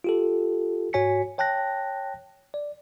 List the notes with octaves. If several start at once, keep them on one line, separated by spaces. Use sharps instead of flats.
F4 G4 A4
G#2 F#4 C#5 G#5 B6 C#7
C#5 G5 A5 F#6 A#6
D5